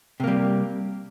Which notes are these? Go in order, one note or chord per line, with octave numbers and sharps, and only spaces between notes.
C3 G3 A#3